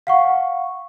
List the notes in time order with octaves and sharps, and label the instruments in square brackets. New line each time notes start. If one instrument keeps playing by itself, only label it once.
[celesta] F5 F#5 C#6